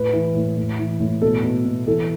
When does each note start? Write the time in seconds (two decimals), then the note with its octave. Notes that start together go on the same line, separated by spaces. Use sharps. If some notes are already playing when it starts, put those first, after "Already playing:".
Already playing: A2 B4
0.13 E3
0.35 A2
0.57 A2
0.79 E3
1.00 A2
1.22 B2 A4
1.44 B2
1.65 B2
1.87 E3 A4